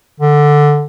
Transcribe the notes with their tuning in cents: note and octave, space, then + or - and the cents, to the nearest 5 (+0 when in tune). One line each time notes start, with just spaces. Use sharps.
D3 +5